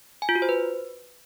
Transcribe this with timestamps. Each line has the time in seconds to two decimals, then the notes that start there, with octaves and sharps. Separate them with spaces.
0.22 G#5
0.29 F4
0.35 F#4
0.42 C5
0.49 B4